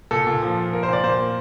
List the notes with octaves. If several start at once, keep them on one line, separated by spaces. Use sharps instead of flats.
A#2 A4
A#2
F3
F3
A#3 A#4
C5
A#2 D5
A#2 C5
A#3